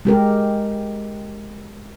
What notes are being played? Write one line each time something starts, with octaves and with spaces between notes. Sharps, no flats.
G#3 G4 A#4